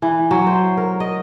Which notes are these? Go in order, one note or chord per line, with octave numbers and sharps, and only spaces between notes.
E3
F#3
C5
A#4
D#5